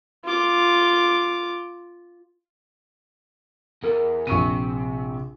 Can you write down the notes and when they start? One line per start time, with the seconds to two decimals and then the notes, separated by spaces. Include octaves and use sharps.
0.24 F4 D6
3.83 E2 A#4
4.27 A#1 C3 C#6 D#7